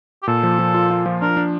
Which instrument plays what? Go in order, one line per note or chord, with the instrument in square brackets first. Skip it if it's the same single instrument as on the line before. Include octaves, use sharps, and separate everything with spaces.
[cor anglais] G4
[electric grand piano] A#2 [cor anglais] A4
[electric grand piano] F3
F3
F4
F4
F3
[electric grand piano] D4 [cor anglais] A#4
[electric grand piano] D4